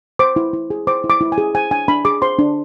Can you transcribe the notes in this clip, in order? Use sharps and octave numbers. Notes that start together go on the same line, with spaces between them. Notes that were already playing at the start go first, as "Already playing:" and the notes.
C5 D6
E4
E4
G#4
C5 D6
E4
D6
E4
G#5
G#4
C5 G#5
D4 G#5
D4 B5
G#4 D6
C5 C6
D4